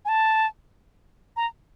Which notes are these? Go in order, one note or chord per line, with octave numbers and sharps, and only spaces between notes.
G#5
A5
A#5